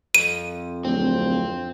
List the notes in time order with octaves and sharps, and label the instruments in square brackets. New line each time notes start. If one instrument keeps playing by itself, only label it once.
[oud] F2 [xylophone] D#7
[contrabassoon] D1 [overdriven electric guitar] C4